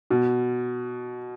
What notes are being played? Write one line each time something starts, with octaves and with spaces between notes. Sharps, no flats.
B2